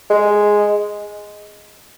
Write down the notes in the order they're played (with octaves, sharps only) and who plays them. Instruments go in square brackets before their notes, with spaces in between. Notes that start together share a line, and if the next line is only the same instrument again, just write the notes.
[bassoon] G#3